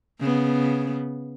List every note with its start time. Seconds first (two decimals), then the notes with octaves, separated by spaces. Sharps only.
0.20 C#3 B3